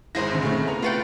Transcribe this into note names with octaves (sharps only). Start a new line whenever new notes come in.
G#1 G#2 G#3 E4 C5 A#6
D3 D#3 C4
C#3 A3 C4
B3 A#5 F7
A3 F4 B4 G5 A6 C#7